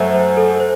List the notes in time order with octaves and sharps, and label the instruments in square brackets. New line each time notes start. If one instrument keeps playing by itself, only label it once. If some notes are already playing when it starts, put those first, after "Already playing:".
Already playing: [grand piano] F#2 F#3 A3 [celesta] C5 E5
[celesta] C5
A4
C5